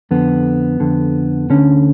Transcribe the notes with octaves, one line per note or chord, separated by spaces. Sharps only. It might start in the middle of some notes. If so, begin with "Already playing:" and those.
F2 D3 B3
F2 D3
D2 D3 C#4